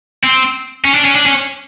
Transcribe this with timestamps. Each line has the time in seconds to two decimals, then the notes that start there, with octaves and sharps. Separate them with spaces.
0.24 C4
0.85 C#4
0.95 D4
1.05 C#4
1.16 D4
1.26 C#4